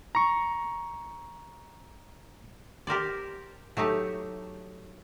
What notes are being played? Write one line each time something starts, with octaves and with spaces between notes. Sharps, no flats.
A#5 C#6
G4 A#4 C5 D5
F#3 A3 D#4 G4